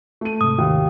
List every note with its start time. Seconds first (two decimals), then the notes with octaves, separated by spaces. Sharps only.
0.21 A3 D#7
0.41 G#2 C3 D#6
0.58 D#2